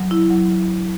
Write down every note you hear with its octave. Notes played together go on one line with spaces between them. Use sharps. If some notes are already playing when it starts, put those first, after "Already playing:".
Already playing: F#3
E4
F#3